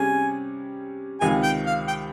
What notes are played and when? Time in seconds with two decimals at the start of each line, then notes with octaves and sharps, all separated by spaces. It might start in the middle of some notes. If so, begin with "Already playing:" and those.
Already playing: C3 G3 C#4 G#4 G#5
1.21 C#2 C3 D#3 G#5
1.43 G5
1.66 F5
1.88 G5